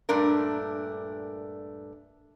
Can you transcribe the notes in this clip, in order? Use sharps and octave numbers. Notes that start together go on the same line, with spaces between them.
G2 A#2 A3 D4 A#4